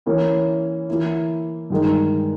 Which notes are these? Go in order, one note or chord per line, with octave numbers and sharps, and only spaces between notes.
E3 A#3 C#4 E4 A#4
E3 A#3 E4
G2 D#3 G#3 D#4 A#4